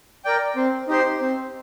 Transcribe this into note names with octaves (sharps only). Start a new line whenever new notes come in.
A#4 D5 G5
C4
D#4 G4 C5
C4